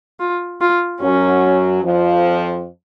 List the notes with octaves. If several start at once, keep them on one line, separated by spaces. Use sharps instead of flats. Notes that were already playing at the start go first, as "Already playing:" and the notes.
F4
F4
F#2 F#3 C#4
F2 F3